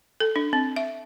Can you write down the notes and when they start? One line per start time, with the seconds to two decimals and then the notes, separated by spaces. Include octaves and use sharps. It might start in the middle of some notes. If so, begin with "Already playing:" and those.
0.20 A4
0.36 D4
0.53 C4
0.76 E5